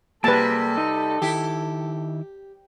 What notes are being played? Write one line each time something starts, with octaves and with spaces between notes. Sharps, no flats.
C3 G3 A#3 G#4 A4 B4 A5
D#4
D#3 E4 G4